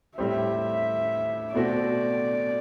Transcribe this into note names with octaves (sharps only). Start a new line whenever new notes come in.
A2 G3 C4 G4 C5 E5
B2 A3 C4 F#4 D5